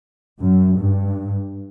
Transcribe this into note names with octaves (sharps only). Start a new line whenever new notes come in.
F#2
G2